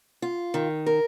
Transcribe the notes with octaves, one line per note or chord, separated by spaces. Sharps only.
F4
D#3
A#4